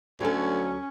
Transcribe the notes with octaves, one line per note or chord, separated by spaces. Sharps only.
D2 F#3 C#4 A4